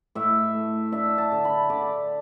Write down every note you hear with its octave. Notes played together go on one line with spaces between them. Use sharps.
A2 E5
A3
D4 E5
A5
D3
B5
D3 D6